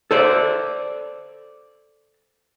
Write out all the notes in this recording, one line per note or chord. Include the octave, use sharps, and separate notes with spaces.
A4 C5 D5